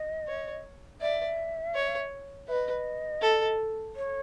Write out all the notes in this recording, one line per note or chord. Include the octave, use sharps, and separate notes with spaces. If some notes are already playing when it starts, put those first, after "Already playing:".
Already playing: D#5
C#5
D5 E5
C#5
B4 D#5 E5
A4
C#5